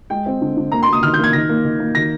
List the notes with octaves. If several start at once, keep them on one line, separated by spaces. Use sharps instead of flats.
G#3 G5
C4
D3
D3
A#3 A#5
C6
A#3 D#6
D#3 F6
G6
A#3 G#6
D#3 A#6
A#3
D#3
A#3
D#3 A#6